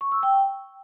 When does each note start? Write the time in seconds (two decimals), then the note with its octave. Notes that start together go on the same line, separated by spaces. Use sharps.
0.01 C#6
0.12 E6
0.23 G5